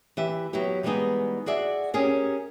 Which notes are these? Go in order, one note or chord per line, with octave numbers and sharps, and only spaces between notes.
E3 G4 E5
F#3 B3 E4 G4
E3 G3 G#3 B3 D#4 G#4
F#4 G#4 D5 E5
C#4 G4 G#4 A#4